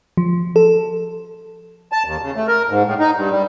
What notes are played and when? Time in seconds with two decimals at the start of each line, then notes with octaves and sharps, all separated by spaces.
0.17 F3
0.56 A4
1.92 A5
2.05 D#2
2.22 C#3
2.36 A3
2.48 A#4
2.70 G#2
2.86 A2
3.00 D#4
3.16 G2
3.30 G3